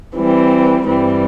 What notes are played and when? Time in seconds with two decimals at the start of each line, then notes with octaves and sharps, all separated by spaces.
0.16 E3 G3 C4
0.85 G2 E3 G3 C4